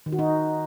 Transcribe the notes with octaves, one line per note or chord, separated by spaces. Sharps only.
D#3
F#4
D#4